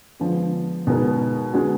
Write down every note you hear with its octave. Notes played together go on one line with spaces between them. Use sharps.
D3 F3 G#3 B3
B2 G#3 B3 D#4 A#4
D3 G#3 B3 D4 F#4